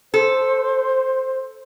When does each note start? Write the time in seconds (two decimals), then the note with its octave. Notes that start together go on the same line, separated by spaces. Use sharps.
0.14 A4 C5